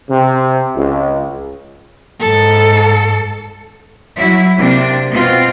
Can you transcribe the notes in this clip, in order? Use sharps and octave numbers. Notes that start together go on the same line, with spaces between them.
C3
C#2
G#2 A4
F#3 E4
C3 A#3 D4
B2 C4 F4